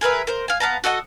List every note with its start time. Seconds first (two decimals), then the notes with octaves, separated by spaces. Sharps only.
0.01 G#4 A#4 B4 E5
0.27 A#4 C5
0.48 F5 G#5
0.60 B3 F5 A5 A#5
0.84 F#4 A4 D#5 F#5